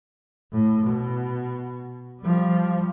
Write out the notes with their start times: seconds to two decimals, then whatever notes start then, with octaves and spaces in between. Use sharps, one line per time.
0.53 A2
0.86 B2
2.23 F3 G3